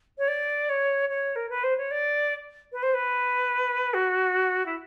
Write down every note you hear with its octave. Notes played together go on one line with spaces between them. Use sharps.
C#5
D5
C#5
C#5
A#4
B4
C5
C#5
D5
B4
C5
B4
F#4
E4